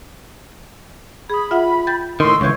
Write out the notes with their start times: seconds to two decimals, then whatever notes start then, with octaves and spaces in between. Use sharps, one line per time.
1.30 G#4 B5 D#6
1.51 F4 E5 F#5
1.87 G5 G6 A6
2.20 A2 D#3 C6 C#6 E6
2.41 C#2 E3 C#5 C#6 G6 G#6